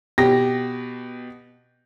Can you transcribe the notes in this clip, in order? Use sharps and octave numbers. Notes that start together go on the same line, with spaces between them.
B2 G4 A#6